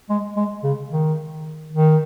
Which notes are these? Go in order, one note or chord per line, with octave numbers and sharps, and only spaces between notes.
G#3
G#3
C#3
D#3
D#3